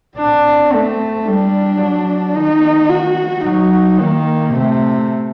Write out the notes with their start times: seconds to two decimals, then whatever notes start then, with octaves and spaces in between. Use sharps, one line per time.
0.18 C4 D4
0.73 A3
1.26 G3 D4
1.81 F#3
2.36 D#3 D#4
2.90 F#4
3.45 F#3 D#4
4.00 D#3 A#3
4.54 C3 A3